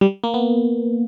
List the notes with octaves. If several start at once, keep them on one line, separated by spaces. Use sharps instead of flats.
G3
A#3
B3